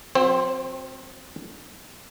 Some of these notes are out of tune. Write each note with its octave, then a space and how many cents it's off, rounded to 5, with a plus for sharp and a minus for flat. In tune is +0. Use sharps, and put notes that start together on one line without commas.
F#3 -35 C4 +0 C5 +40